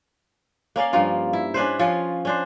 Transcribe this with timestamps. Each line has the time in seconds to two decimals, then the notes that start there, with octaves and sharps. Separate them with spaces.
0.76 A#3 C#4 D5 F5
0.93 G2 F3 A#3 F4
1.33 E4
1.54 C#4 D4 B4 C5
1.79 F3 C#4 F4 C#5
2.25 C#4 D4 C5